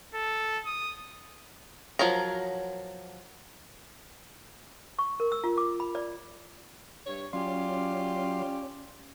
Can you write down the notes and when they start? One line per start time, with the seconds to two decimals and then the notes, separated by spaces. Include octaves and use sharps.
0.15 A4
0.65 D#6
1.99 F3 F#3 A#4 A#5
4.99 C#6
5.20 A#4
5.32 E6
5.44 F4
5.58 D6
5.80 B5
5.95 D5
7.07 G2 C#5
7.33 F#3 C#4 F4 G4 D5 C6